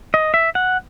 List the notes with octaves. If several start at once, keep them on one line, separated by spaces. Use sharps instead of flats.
D#5
E5
F#5